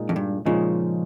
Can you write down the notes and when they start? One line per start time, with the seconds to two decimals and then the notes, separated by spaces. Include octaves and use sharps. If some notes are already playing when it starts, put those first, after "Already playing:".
Already playing: A#2 G#3 D#4
0.09 F2
0.16 G2
0.46 A#2 C#3 F3 G#3 D#4